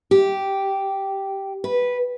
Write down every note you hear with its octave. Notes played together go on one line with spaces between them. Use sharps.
G4
B4